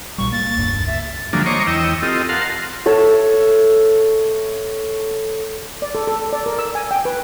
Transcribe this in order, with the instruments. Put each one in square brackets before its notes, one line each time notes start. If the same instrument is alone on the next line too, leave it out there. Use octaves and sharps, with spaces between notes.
[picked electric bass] B1 A#2 G3 [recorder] C#6
[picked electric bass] A#3 [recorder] A6
[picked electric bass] E1 C#2 G2
[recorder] E5
[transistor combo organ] D3 F3 F#3 G#3 A#3 D4
C5 C#5 D#5 A#5 C#6 D6
E2 D#5 G5 E6
C4 F4 G4 A4 D#5
A#4 F5 F#5 A5 C6
[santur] A4 C#5 E5
[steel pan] D5
A4
A4
D5
A#4
E6
G#5
G5
B4